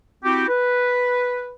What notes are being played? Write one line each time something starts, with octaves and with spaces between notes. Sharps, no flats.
C4 E4 F#4 G4
B4